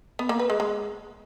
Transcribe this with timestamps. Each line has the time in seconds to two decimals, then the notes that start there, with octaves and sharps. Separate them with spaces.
0.19 B3
0.29 A#3
0.39 B4
0.50 G#3
0.60 G#3